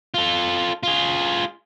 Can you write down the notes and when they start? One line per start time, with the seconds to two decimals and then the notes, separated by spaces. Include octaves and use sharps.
0.14 F4 A4
0.83 F4 G#4